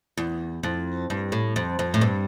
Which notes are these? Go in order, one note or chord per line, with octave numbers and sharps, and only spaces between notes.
E2
F2
G2
A2
F2
F2
A2
G2